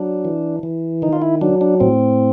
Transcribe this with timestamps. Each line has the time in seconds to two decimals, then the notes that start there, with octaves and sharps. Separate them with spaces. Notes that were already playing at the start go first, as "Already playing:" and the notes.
Already playing: F#3 D4
0.25 E3
0.63 E3
1.02 D#3 D#4
1.13 F4
1.22 E4
1.41 F#3 D4
1.61 D4
1.80 A2 C4